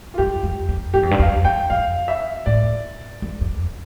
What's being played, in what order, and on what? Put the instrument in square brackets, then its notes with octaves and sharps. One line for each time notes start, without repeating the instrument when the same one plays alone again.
[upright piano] F4
[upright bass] G2 [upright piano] G4
[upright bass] F2
F2
[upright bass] G2 [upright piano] G4
[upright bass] F2
G2
[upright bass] F2 [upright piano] F5
[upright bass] E2 [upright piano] G5
[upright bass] F2 [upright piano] F5
[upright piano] E5
[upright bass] A2 [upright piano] D5
[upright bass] F2
F2